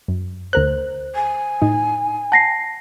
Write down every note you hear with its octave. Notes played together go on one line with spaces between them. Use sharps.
F#2
D2 A#4 C5 F#6
G#5
A2 D#4
F#5 A5 A#6 C7